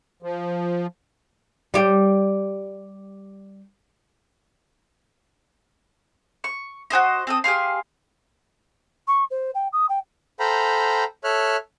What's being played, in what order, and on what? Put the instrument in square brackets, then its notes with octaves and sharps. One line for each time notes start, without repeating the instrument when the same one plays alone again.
[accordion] F3
[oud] G3 G4
[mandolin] C#6
F#4 G4 C5 D#5
C4 A4 D#6
G4 G#4 F5 C6
[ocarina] C#6
C5
G5
D#6
G5
[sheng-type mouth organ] A4 C5 F5 G5 A#5 B5
A4 C#5 E5 F6 F#6